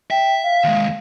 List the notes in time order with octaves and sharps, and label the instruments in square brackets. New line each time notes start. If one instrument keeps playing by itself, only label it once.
[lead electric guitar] E5 [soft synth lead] G5
[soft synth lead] F5
[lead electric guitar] D#2 G#3